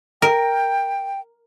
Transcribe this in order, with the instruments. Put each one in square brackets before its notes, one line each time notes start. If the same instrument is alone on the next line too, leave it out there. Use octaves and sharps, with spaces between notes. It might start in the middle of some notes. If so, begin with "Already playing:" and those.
[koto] A#4 [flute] G5